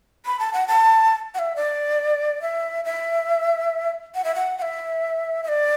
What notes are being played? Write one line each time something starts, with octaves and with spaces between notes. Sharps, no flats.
B5
A5
F#5
A5
F#5
E5
D5
E5
E5
F#5
E5
F#5
F#5
E5
E5
D5